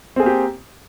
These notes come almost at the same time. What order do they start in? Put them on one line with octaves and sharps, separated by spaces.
C4 G#4 A#3 G4